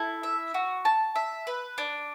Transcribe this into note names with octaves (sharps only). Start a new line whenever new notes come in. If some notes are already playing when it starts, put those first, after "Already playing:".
Already playing: E4 A4
E5
F#4
A5
E5
B4
D4